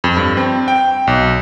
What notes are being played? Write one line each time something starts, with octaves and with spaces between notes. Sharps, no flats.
F2
G2
C4
G5
B1